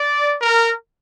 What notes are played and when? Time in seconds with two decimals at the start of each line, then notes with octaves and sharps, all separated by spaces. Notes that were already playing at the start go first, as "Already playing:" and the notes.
Already playing: D5
0.40 A#4